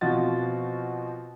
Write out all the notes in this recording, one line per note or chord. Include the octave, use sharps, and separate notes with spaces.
B2 F3 C4 F4 F#4 A6